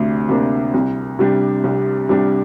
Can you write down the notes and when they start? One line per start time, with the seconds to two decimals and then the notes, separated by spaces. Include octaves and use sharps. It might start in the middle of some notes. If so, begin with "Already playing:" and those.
Already playing: D2 C3 D4
0.29 C3 A#3 D4
0.74 C2
1.19 C3 G3 D4 G4
1.64 C2
2.09 C3 G3 D4 G4